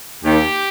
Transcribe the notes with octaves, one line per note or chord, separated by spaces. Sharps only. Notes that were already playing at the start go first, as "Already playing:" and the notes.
D#2 G4